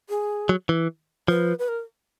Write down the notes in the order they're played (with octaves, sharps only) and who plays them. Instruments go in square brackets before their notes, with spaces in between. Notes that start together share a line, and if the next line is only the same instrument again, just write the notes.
[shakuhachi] G#4
[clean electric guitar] F#3
E3
[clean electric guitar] F3 [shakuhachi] B4
[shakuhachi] B4
A#4